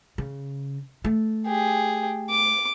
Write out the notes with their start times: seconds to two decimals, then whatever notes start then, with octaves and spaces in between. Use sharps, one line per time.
0.18 C#3
1.05 A3
1.46 G4 G#4
2.30 D6